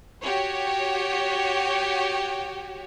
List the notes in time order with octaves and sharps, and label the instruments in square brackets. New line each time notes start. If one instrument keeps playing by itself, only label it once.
[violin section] F#4 G4 C#5